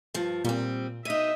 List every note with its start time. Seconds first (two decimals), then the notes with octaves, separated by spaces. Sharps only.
0.14 G2 F3
0.45 A#2 G3 C4
1.05 B2 D#4 D#5 E5 D#7